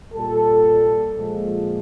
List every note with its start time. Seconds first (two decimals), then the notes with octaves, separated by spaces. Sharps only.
0.15 A#2 G3 A4
1.16 A#2 F3 G#3